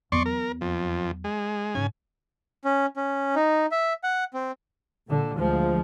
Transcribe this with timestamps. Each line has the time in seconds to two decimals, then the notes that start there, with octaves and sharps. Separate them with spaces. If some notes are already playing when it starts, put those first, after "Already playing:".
0.12 E2 F#3 D5 C6 C#6
0.26 A#4
0.61 F2
1.24 G#3
1.75 G#2 C#3 G#5
2.65 C#4
2.97 C#4
3.36 D#4
3.72 E5
4.04 F#5
4.34 C4
5.06 A#2 D3
5.37 D2 F3 G#3